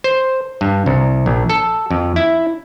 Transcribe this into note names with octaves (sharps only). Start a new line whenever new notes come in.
C5
G2
C2
A#1
A4
F2
E4